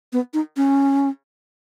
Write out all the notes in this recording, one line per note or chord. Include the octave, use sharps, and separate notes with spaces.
B3
D#4
C#4